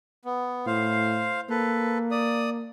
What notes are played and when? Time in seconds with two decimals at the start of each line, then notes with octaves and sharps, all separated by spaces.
0.25 B3
0.66 A2 C5 F5
1.50 A#3 A4 B4
2.11 D5 D#6